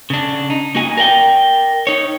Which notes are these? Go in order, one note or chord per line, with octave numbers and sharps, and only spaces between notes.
C#3 D4
D#4
A#3 F#4 G#5
A#4 D5 F#5 G5
D#4 C#5